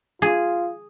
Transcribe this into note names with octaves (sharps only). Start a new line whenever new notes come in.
F4 G#4